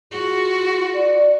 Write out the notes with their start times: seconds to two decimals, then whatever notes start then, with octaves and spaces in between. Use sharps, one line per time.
0.11 F4 F#4 G#4
0.94 D5